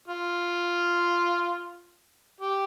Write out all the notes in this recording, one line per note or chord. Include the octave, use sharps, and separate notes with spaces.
F4
G4